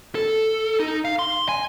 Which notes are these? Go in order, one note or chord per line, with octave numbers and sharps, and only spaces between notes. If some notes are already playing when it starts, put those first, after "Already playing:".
A4
D#4
F5
C6
G#5